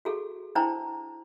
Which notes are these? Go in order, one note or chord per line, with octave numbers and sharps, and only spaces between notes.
F#4 G#4 A4
D4 E4 C5 G5 A5 A#5